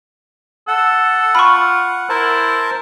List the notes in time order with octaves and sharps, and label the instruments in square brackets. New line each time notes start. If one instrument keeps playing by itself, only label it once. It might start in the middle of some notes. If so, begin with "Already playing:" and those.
[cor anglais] A4 [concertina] F#5
[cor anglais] F4 [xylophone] B5 C#6
[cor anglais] E4 [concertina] A#4 C5 A5